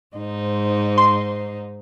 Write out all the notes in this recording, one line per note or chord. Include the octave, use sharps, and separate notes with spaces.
G#2 D#4 C5
C6